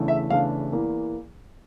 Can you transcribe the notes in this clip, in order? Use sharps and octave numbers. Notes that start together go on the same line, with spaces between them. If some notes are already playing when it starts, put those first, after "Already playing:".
Already playing: E2 C#3 E3 A3 D4
E5
E2 C#3 E3 A3 D4 F5
E2 E3 A#3